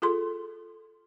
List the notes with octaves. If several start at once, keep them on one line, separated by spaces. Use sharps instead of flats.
F4 G#4 A4 C6